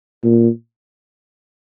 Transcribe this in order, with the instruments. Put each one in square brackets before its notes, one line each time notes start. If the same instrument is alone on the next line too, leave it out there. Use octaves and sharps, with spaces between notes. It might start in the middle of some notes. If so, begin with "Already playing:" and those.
[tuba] A#2